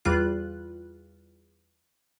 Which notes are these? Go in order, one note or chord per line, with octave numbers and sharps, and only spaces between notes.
E2 G3 F4 F#6